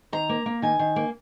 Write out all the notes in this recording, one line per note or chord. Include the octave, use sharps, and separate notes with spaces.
D#3 A#5
A#3
A#3
D#3 G#5
D#3
A#3